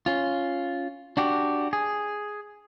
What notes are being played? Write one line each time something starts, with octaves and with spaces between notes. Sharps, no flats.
C#4 F4
D4 F#4 G4
G#4